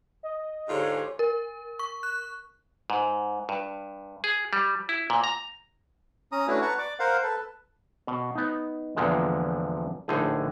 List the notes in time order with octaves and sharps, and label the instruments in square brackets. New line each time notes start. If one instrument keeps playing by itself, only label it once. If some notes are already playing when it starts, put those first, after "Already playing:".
[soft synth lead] D#5
[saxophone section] G#2 D3 F4 [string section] G4 G#4 C#5
[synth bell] A#4
C#6
F#6
[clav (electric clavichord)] G#2
G2
G#4
G3
E4
A#2
A#5
[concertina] C#4 A#5 D#6
A3 C#4 D4 E4 F#4 B4
B4 F#5 A5 A#5 C#6
D5 D6
A#4 C5 F5 F#5
A4 B4 A5
[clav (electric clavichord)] B2
B3 D#4
E2 A#2 D3 F3 G#3
A#1 A2 D3 D#4 G#4